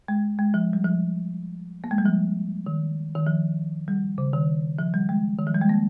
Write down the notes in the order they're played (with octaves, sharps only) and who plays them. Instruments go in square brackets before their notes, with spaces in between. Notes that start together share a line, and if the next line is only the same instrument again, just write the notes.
[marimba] G#3
G#3
F3
G3
F3
A#3
G#3
G3
F3
D#3
D#3
F3
G3
C#3
D#3
F3
G3
G#3
D#3
F3
G3
G#3
A#3